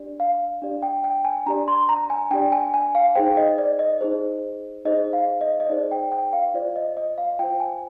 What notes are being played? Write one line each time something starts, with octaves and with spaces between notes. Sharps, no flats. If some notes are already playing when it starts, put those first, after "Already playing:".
Already playing: D4 G4 D5
F5
D4 G4 D5
G5
G5
G#5
D4 G4 D5 A#5
C6
A#5
G#5
D4 G4 D5 G5
G#5
G#5
F5
D#4 G#4 C5 G5
D#5
D5
D#5
D#4 G#4 C5
D#4 G#4 C5 D#5
F5
D#5
D#5
D#4 G#4 C5 D5
G5
G5
F5
F4 C5 D5
D#5
D#5
F5
F4 C5 G5
G#5